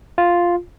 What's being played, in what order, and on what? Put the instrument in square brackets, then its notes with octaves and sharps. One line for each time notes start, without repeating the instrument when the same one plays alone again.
[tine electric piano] F4